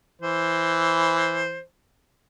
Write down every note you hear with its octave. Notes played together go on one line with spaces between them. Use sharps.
E3 C5